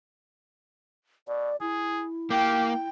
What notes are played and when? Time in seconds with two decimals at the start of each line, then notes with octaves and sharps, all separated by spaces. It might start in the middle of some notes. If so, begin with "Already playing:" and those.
1.28 B2 D5
1.61 E4 G#4
2.30 A#3 G4 G5